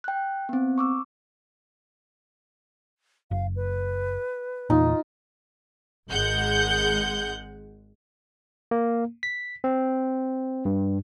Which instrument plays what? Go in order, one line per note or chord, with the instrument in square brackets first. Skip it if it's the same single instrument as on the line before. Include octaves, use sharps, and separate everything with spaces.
[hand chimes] G5 F#6
B3 C4
C#6 D6 E6
[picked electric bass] F#1 [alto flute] F5
[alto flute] B4
[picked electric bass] E2 A#2 [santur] D#4 F4
[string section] G#1 G#3 F#5 G6
[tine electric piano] A#3
B6
C4
G2